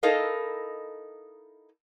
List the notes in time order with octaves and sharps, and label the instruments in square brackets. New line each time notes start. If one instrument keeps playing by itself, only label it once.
[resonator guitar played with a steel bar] D#4 E4 A4 A#4 D#5 F5